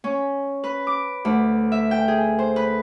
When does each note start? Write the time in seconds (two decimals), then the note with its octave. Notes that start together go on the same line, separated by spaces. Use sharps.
0.04 C#4
0.64 B4
0.87 D6
1.25 D2
1.72 E5
1.91 G5
2.08 G#4
2.39 C5
2.56 B4